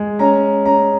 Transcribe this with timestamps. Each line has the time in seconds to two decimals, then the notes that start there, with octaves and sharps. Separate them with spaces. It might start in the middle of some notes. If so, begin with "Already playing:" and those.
Already playing: G#3
0.19 C#4 A#5
0.66 C#4 A#5